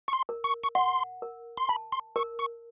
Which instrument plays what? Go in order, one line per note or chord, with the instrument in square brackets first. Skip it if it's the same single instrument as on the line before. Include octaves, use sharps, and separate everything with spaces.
[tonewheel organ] C#6
C6
[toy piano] A#4
[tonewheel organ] C#6
C#6
[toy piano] F#5 [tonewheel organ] C6
[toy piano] A#4
[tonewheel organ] C6
[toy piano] A5 [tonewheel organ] B5
[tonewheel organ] C6
[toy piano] A#4 [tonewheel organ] C#6
[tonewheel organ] C#6